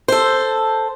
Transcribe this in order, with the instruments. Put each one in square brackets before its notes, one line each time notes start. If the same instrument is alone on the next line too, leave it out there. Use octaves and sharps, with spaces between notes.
[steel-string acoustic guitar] A4 C5